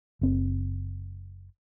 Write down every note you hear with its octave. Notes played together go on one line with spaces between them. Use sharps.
F#1 C4